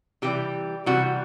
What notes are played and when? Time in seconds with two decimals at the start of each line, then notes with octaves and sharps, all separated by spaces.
0.22 C3 E3 G3 G4
0.86 C3 E3 G3 F#4